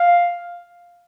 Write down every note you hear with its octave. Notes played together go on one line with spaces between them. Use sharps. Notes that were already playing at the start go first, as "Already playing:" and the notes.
Already playing: F5